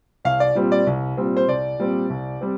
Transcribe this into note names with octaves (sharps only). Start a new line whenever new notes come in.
C2 F5
D5
A#2 G3 C4
D5
C2
A#2 G3 C4
C5
C2 D5
A#2 G3 C4
C2
G3 C4